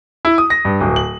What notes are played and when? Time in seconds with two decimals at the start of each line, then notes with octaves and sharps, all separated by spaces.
0.25 E4
0.38 D#6
0.50 A#6
0.65 G2
0.81 D1
0.96 F#7